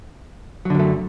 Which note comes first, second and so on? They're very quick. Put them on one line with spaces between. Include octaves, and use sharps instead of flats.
F#3 D3 F#2 A3